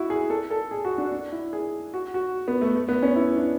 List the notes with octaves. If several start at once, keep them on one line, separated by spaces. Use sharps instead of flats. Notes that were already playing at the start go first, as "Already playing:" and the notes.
Already playing: E4 F#4
G#4
A4
A4
G#4
F#4
D4
D4
E4
G#4
F#4
F#4
B3
A3
A3
B3
C#4
E4
D4